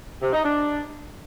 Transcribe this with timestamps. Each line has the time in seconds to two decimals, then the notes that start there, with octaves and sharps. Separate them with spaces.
0.22 C3
0.33 D#4
0.43 D4